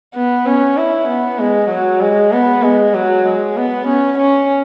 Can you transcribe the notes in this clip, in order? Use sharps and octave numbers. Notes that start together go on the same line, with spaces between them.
B3
C#4
E4
B3
G#3
F#3
G#3
B3
G#3
F#3
G#3
B3
C#4
C#4